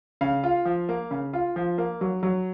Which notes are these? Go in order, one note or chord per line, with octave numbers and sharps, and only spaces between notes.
C#3 F5
F4
F3
A#3
C#3
F4
F3
A#3
F#3
F#3